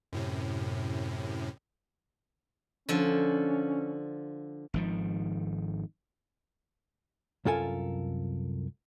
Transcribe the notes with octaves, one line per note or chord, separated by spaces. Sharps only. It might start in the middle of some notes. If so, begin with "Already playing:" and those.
F#2 A2 C3
D3 F3 C#4
G#1 D#3 F3
C2 F#2 F4 A4 A#4 G#5